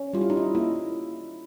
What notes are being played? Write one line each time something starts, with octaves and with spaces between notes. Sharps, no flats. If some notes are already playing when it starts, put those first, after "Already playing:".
Already playing: C#4
G3 F4
E4
D#4
E4
A#3 E4